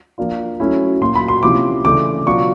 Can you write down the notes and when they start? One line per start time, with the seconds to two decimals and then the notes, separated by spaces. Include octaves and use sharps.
0.18 F3 A#3 D4 F4
0.60 F#3 A3 C#4 E4
1.01 A#2 F#3 A#3 C6
1.15 B5
1.28 C6
1.43 C3 F3 A#3 C#4 E4 D6
1.85 C#3 E3 A3 D4 D6
2.26 B2 F#3 B3 D4 F4 C#6